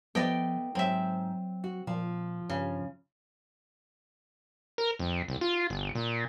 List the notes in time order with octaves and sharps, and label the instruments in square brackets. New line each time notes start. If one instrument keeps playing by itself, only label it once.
[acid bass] F3 [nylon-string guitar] A3 B3 [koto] D5 D#5 G5
[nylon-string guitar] G#2 [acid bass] F#3 [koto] C4 E5
[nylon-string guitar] F#4
[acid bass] A#2 [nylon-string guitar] F3
[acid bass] G2 [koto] C#3
[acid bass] A#4
F2
C2
F4
G1
A#2